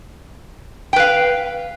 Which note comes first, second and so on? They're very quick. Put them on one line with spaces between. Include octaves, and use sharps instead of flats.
G5 B4 F5